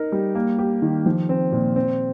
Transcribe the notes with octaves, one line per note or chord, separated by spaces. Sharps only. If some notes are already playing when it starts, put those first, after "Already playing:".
Already playing: D#4 A#4
G3
A#3
G4
D#3
F3
C4
A#2
C4